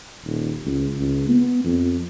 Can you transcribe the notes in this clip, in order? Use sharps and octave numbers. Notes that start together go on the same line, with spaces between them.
D#1
C#2
C#2
B3
F2